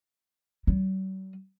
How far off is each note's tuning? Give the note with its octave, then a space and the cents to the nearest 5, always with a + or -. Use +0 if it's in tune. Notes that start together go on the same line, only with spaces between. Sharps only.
F#3 +45